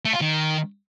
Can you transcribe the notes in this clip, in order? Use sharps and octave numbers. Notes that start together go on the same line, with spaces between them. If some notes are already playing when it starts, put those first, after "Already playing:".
A3
F4
D#3